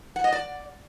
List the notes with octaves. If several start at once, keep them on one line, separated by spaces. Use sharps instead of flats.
F#5
D#5
D5